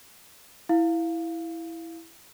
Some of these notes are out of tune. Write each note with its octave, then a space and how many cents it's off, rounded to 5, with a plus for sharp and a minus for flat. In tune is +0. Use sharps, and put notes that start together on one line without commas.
E4 +0 F5 +0